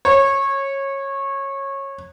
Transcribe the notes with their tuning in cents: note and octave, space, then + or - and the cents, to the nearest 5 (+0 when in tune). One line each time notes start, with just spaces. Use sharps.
C#5 -20